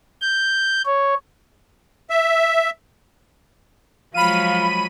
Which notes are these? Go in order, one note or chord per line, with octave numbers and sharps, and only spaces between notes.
G6
C#5
E5
F3 F#3 G#3 F5 B5 D#7